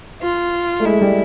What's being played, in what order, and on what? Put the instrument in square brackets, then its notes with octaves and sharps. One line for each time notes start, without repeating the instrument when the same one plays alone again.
[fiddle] F4
[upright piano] A3
[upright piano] G#3 [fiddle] E4
[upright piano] G3